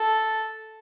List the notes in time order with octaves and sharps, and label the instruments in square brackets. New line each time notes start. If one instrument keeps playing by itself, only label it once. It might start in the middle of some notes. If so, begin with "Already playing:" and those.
Already playing: [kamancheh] A4